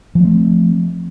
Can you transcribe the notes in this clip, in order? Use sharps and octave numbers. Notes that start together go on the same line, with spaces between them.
F3 A3 C4